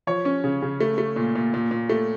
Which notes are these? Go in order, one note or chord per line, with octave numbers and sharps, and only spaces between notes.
F3 C#5
C#4
C#3
C#3
A3
A3
A#2
A#2
A#2
A#2
A3